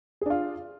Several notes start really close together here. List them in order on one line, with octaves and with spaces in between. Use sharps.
G#4 D4 F4